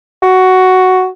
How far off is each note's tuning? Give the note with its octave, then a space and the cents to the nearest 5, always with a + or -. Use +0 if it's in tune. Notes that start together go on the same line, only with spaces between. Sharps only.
F#4 +5